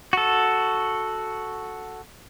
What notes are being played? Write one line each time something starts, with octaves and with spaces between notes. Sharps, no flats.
F#4 A4